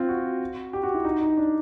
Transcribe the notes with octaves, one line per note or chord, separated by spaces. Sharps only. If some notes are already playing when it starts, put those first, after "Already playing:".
Already playing: C4 F4
F#4
G4
F#4
E4
D#4
D#4
D4